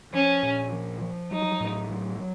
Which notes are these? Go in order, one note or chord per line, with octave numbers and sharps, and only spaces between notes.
F3 C#4
A#2
F3
F3
F#3 D#4
A2
F#3
F#3